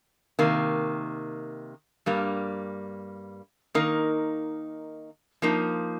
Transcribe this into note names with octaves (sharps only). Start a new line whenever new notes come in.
C3 D#3 A#3
G2 G3 A#3
D#3 A#3 D#4 A#4
F3 A#3 D#4